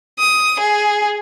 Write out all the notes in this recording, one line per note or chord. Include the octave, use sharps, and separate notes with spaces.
D#6
G#4